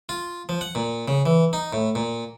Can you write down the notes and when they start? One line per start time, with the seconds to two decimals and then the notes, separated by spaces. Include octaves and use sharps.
0.09 F4
0.49 F3
0.61 F#5
0.75 A#2
1.08 C#3
1.26 E3
1.53 D#4
1.73 A2
1.95 A#2